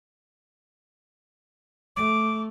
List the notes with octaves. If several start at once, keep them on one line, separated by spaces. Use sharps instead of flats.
A3 D6